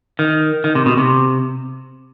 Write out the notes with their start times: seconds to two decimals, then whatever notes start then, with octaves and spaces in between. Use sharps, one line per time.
0.19 D#3
0.64 D#3
0.75 C3
0.86 B2
0.98 C3